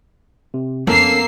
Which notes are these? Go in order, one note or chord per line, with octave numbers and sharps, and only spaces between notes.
C3
F2 A#3 B3 C#4 A4 A#4 E6 C7